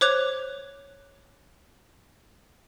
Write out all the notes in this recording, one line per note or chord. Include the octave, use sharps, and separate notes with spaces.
C5 C#5 D6 F#6 G#6 F7